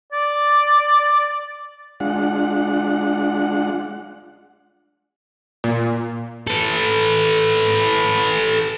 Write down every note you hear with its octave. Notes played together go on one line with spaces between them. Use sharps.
D5
G#3 D4 F4 F#5
A#2
A4 B4